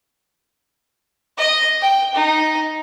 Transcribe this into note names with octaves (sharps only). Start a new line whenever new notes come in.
D#5
G5
D#4